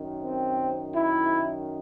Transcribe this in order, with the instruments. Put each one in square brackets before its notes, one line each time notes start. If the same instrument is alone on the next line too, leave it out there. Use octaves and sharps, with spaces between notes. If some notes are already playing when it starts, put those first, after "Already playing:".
Already playing: [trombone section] F#2 D#3
C4
E4